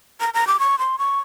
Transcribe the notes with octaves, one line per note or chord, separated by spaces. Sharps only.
A#5
A#5
D6
C#6
C6
C#6